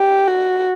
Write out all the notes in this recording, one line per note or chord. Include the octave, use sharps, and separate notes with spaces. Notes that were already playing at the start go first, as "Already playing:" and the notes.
Already playing: G4
F#4